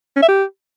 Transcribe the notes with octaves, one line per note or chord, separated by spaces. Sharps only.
C#4
E5
G4